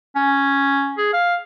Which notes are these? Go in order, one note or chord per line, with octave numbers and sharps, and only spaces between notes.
C#4
G#4
F5